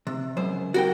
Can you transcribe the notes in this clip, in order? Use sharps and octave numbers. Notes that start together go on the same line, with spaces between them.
C3
C#2 F#2 C5
F#4 A#4 G5